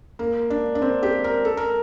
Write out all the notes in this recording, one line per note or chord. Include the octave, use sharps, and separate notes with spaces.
A#3
D4
D4
C4
G4
A#4
A4
A#4